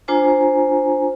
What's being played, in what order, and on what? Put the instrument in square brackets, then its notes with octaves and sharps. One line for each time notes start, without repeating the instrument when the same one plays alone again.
[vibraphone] D4 F4 C5 G#5 A#5